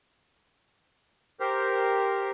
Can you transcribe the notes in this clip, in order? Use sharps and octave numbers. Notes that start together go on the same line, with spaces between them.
G4 A#4 C5